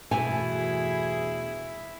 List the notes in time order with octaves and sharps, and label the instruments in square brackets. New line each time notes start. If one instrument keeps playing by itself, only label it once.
[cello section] E2 G2 G#4 [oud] B2 E3 A3 [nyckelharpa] E4 [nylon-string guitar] G#5